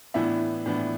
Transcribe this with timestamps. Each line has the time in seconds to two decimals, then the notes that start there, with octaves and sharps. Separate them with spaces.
0.14 A2 E3 B3 D4 E5
0.66 A2 E3 B3 D4